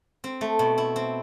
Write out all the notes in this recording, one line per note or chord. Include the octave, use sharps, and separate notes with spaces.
C4
A3
B2
E4
C4